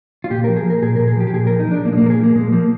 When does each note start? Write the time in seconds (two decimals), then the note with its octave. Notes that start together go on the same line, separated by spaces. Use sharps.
0.24 F4
0.30 A#2 G4
0.44 A#4
0.48 F3
0.56 G#4
0.65 F3
0.70 A#4
0.82 A#2 G#4
0.96 A#2 A#4
1.07 G#4
1.16 F3 G4
1.27 G4
1.33 A#2 G#4
1.47 F3 A#4
1.60 D#4
1.67 F3 D4
1.85 A#2 A#3
1.93 G#3
1.97 A#3
2.01 A#2 A#4
2.10 G#4
2.19 F3 A#3
2.35 A#2 G#3
2.52 F3 A#3